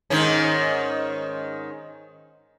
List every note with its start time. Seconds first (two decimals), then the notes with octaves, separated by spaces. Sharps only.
0.10 G#2 D#3 C#4